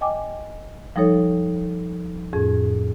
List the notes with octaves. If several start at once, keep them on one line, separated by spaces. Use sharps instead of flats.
D#5 G5 G#5 D6
F3 G3 D#4 A4 C#5
F2 A2 C#4 G#4